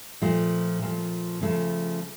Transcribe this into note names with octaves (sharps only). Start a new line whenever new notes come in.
A#2 F3 A3
A#2 F3 A3
C#3 F3 A3 C#4